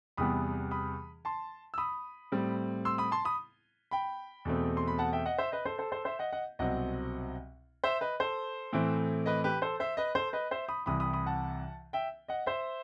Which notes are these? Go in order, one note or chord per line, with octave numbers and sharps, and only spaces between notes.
E2 C3 E3 G3 B3 B5 D#6
B5 D#6
A5 C6
E6
B5 D#6
A2 G3 C4
C6 E6
B5 D#6
A5 C6
B5 D#6
G5 B5
E2 B2 A3 C4
C6
B5
F#5 A5
E5 G5
D#5 F#5
C5 E5
B4 D#5
A4 C5
A4 C5
A4 C5
C5 E5
D#5 F#5
D#5 F#5
C2 B2 F#3 C4 D#5 F#5
C5 E5
B4 D#5
A4 C5
A2 E3 A3 C4
B4 D#5
G4 B4
A4 C5
C5 E5
B4 D#5
A4 C5
B4 D#5
C5 E5
B5 D#6
C2 C3 E3 B5 D#6
B5 D#6
B5 D#6
F#5 A5
E5 G5
D#5 F#5
C5 E5